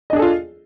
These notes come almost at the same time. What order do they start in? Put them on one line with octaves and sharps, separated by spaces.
D#5 D4 G#4 A4 F4